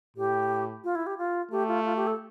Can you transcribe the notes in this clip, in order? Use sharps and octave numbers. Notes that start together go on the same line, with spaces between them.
A2 G4
F4
E4
G4
F4
A3 G4
F4
F4
G4
A4